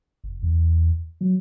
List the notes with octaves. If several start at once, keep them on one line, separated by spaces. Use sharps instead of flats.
F1
E2
F#3